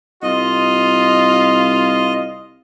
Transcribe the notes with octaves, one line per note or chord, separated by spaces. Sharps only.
C2 F4 D#5